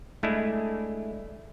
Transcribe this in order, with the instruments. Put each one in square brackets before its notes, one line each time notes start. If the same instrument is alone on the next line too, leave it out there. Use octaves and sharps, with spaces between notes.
[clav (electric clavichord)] G#3 A3 D4 E4